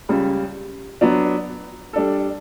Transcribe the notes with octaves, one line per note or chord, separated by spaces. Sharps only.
C#2 C#3 G3
F#3 B3 D4
G3 D4 A4